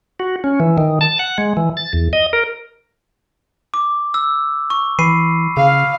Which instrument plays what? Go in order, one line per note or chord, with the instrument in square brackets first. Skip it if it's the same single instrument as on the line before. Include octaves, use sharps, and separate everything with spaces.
[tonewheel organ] F#4
C#4
E3
D#3
A5
F#5
G#3
E3
A6
E2
D#5
A#4
[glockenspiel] D6
E6
C#6
[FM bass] E3 [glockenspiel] B5 C7 D#7
[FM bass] C#3 [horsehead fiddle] F5